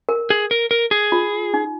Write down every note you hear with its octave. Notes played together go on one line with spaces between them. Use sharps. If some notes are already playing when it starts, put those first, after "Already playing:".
A#4
G#4
A#4
A#4
G#4
F4
D#4